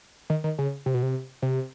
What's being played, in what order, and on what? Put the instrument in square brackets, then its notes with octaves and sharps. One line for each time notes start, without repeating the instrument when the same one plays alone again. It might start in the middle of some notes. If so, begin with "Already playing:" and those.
[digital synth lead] D#3
D#3
C#3
C3
B2
C3
C3